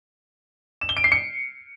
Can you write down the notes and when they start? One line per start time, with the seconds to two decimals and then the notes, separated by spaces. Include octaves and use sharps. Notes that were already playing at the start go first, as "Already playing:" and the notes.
0.81 E7
0.89 G7
0.97 D7
1.04 C7
1.12 C#7